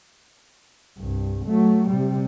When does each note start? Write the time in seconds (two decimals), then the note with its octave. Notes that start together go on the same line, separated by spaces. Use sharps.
0.99 C2 G2
1.46 F#3 A3
1.90 C3 G3